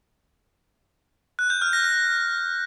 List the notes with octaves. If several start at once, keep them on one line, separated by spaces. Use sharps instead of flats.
F#6
G6
F6
A#6
A#6